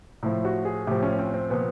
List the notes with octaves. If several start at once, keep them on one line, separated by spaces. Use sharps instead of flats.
A2 F3 E4
F#4
G#4
A2 F3 G4
C#4
C4
C4
A#2 F3 B3